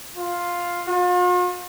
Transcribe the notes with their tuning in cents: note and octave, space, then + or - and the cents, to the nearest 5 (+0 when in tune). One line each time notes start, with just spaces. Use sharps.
F4 +5
F4 +45